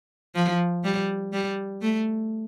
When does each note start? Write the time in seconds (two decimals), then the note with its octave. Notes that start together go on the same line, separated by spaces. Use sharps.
0.35 F3
0.84 G3
1.33 G3
1.82 A3